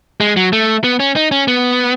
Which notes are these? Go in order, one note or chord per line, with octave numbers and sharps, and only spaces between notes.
G#3
F#3
A3
B3
C#4
D#4
C#4
B3